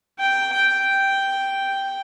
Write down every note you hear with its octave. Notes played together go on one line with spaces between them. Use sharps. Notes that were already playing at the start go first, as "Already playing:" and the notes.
G5
G5